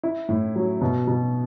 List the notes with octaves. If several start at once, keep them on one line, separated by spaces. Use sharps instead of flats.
E4
A2
F#3
B2
B2